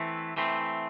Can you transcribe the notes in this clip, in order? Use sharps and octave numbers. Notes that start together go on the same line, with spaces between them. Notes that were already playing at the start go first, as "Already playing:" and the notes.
Already playing: E3 A3 C4
E3 A3 C4